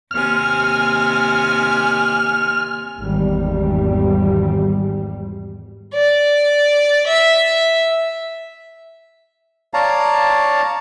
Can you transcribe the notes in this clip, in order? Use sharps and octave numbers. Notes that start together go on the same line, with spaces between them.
D#2 C3 G#5 F6
G#1 E2 G3
D5
E5
C#5 D5 F5 A5 A#5